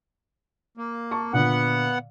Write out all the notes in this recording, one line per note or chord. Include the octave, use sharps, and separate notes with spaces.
A#3
A5 C#6
A#2 D3 B3 F#5